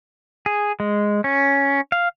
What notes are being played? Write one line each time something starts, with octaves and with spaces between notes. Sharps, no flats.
G#4
G#3
C#4
F5